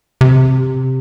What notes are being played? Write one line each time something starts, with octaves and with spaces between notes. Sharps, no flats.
C3